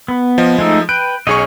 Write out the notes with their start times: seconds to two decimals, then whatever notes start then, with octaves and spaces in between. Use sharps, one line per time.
0.08 B3
0.38 F3 D#5
0.59 G#3 A3 D#4
0.89 B4 G5 F#6 D7
1.27 B1 C#4 G#4 C#5 D#5 C#6